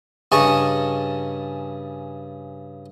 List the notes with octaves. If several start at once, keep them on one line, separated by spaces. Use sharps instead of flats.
G2 C#3 G#4 D#5 A5 C#6